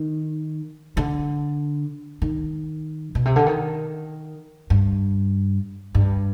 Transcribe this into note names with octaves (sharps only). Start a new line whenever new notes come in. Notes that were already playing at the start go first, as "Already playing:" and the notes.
Already playing: D#3
D3
D#3
B2
C3
D3
D#3
G2
G2